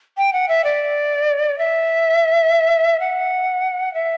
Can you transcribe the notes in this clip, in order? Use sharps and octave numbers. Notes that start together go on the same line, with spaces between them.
G5
F#5
E5
D5
E5
F#5
E5